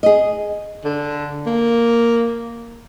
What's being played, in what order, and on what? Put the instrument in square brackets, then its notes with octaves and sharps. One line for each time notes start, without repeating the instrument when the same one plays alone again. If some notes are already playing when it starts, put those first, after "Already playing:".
[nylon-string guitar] G#4 D#5
[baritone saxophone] D3
A#3